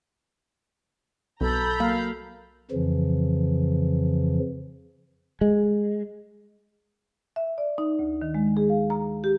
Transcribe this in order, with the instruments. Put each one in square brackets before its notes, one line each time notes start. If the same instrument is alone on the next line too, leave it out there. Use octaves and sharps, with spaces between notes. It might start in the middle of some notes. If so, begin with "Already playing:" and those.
[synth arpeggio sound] B1 [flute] A4 [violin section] A#5 B5 G6
[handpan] F#3 A#3 F5
[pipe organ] F2 C#3 E3 F3
[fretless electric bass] G#3
[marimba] E5
D5
D#4
D2
D#3
G#3
G#4
F5
A#5
G4